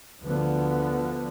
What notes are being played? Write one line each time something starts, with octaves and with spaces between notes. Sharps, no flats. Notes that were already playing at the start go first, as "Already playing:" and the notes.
D2 D3 F3 B3